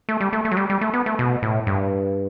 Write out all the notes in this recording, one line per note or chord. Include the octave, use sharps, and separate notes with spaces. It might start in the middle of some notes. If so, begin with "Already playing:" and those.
A3
G3
A3
A3
F#3
G3
G3
A3
B3
A3
B2
A2
G2